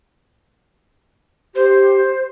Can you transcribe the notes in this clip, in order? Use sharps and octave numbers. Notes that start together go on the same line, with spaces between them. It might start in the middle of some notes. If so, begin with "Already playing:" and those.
G4 C5